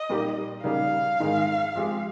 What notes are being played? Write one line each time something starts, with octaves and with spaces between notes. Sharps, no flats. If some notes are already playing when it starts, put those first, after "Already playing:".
Already playing: D#5
A#2 G3 A#3 D#4 G4
C#3 G3 A#3 D#4 F5
G#2 D#3 G#3
F3 G#3 C4 G4